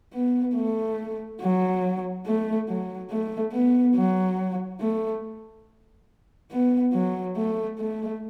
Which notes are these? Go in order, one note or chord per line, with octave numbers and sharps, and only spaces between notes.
B3
A3
F#3
A3
F#3
A3
B3
F#3
A3
B3
F#3
A3
A3